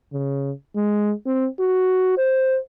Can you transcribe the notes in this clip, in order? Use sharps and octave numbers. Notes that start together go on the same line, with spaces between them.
C#3
G#3
C4
F#4
C5